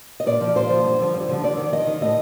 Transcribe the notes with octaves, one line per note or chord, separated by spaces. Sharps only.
D#5
A#2 D5
F3
A#2 C5
F3
G2
D3 F3
G2
D3 F3
F2 D5
D#3
F2 D#5
D#3
A2 D#5